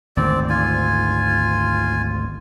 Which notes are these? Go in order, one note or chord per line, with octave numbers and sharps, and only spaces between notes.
G#1 D2 G#2 C4 D5
F4 G#5